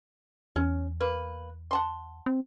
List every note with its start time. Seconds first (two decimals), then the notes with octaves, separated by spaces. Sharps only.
0.56 E2 C#4
1.00 A#3 B4
1.71 F#5 A5 C6
2.26 C4